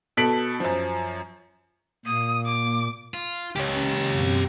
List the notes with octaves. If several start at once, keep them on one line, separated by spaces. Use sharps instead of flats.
B2 A4 B6 D7 F#7
F#2 F3
A#2 A#3 D#6
D6
F4
C#2 C#4 G4 C#5
F#2 B2 C4